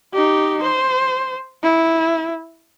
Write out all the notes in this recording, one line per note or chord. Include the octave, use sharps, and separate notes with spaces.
D#4 G4
C5
E4